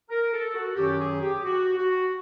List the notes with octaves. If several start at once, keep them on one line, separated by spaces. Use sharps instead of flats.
A#4
A4
F#4
F#2 D#3 F#3 G4
G#4
G4
F#4
F#4